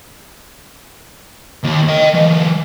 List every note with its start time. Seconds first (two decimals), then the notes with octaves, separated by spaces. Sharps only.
1.64 D#2
1.88 D#5 G5
2.14 E3 F#3